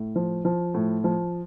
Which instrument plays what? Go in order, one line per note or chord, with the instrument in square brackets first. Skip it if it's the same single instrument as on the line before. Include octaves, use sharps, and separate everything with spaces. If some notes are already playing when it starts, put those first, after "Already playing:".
Already playing: [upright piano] A2
F3
F3
A2
F3